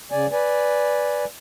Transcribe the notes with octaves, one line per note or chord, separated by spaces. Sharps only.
C#3 D5 G#5
B4 D5 G#5